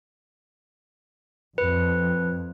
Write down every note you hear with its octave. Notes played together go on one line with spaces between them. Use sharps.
F2 B4